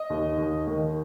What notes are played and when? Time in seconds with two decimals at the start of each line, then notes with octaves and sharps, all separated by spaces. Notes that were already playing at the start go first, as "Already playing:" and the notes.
Already playing: D#5
0.10 D#2
0.38 D#2
0.67 D#3